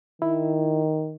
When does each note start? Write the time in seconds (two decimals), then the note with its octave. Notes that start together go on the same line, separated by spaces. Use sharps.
0.22 D#3 E4